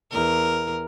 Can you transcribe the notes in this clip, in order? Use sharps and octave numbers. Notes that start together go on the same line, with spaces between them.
E2 A#4